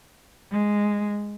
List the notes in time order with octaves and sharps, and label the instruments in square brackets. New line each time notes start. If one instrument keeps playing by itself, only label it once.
[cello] G#3